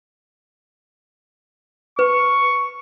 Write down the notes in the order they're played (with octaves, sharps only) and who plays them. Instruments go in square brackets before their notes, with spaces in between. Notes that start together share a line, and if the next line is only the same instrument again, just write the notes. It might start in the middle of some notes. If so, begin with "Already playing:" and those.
[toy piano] B4 [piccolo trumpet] C#6